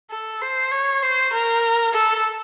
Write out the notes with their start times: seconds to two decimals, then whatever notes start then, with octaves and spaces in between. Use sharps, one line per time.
0.11 A4
0.41 C5
0.72 C#5
1.03 C5
1.33 A#4
1.94 A4